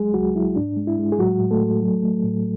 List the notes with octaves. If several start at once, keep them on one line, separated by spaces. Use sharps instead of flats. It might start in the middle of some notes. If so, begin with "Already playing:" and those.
Already playing: C#2 F#3 G#3 G#4
C#2 F#3 F#4
F#3 E4
G#2 D4
G#3
E4
G#3
G#4
A2 F#3 F#4
A2
A3 A4
A2
F#3
A3
A2